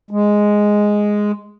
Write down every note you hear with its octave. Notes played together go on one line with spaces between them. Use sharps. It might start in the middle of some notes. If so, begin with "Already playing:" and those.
G#3